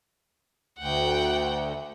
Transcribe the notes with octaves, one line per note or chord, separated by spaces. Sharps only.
D2 F#5 G5